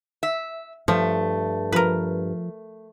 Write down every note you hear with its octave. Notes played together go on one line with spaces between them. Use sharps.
E5
G2 F3 A3
F3 A#4 B4